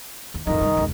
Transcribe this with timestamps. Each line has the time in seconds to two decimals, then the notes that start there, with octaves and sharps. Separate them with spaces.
0.34 D#2
0.47 F2 A2 D#3 D#4 D#5
0.61 C2 G2
0.77 F1 C#2